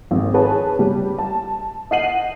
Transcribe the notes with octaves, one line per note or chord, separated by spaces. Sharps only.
G#1
G#4 B4 C#5 A5
G3
A5
D#5 F#5 C7 D#7 F#7